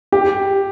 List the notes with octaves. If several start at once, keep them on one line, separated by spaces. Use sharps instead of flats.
G4